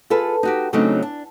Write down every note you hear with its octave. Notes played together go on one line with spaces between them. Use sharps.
F4 G#4 A4 B4
D#4 F#4 G4
C#3 F#3 A3 C4 D4 D#4
D4